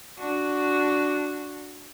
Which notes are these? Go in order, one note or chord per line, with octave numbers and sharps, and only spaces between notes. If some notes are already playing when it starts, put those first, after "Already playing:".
D4 F#4